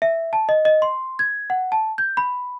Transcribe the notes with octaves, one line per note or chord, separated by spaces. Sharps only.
E5
A5
D#5
D#5
C6
G#6
F#5
A5
G6
B5